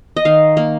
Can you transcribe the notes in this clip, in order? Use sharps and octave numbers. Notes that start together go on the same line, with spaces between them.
D#5
D#3 F5
A#3